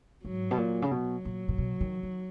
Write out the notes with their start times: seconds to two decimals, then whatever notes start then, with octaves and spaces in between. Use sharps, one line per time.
0.25 G#2 F#3
0.51 B2
0.58 A#2
0.82 C#3
0.91 B2 F#3
1.25 A#2
1.49 A#2
1.58 B2
1.81 D#3
2.03 D#3